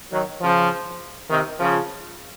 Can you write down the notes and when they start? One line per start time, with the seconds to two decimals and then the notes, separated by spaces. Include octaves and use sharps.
0.11 D#3 F#3
0.41 C#3 F3
1.30 C3 D#3
1.59 C#3 F3